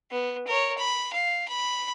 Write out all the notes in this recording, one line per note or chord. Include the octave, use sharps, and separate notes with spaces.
B3
A#4 C#5
B5
F5
B5